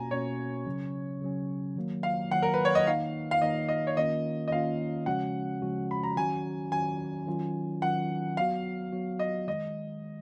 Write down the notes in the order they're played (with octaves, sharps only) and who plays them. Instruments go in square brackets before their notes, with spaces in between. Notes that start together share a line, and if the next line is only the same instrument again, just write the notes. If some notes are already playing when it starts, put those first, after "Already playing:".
Already playing: [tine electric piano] B2 A#3 C#4 F#4 [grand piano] G#5 A#5
[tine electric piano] B2 A#3 C#4 F#4 [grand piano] C#5
[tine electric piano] C#3 F#3 C#4
C#3 F#3 C#4
D#3 F#3 A#3
[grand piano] F5
[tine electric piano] D#3 F#3 A#3 [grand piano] F#5
[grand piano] A#4
B4
C#5
D#5
[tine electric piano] D#3 A#3 D#4 [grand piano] F5
[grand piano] F5
[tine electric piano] D#3 A#3 D#4 [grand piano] D#5
[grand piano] D#5
C#5
[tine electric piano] D#3 A#3 C#4 F4 [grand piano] D#5
[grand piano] D#5
[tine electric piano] D#3 A#3 C#4 F4 [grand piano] F5
[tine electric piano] C#3 F3 G#3 C#4 F#4 [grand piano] F#5
[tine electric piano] C#3 F3 G#3 C#4 F#4
[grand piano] B5
A#5
[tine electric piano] D#3 F#3 C#4 F#4 [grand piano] G#5
[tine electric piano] D#3 F#3 C#4 F#4 [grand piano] G#5
[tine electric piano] D#3 F#3 C#4 F4
[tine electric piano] D#3 F#3 C#4 F4 [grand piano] F#5
[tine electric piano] F#3 B3 F#4 [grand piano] F5
[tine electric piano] F#3 B3 F#4
[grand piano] D#5
[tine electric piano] D#3 G#3 [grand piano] D#5